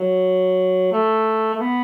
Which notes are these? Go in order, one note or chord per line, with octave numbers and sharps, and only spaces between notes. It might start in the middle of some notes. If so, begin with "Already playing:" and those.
Already playing: F#3
A3
A3
B3